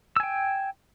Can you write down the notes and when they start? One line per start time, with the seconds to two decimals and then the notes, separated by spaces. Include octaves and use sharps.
0.16 E6
0.20 G#5
0.23 G5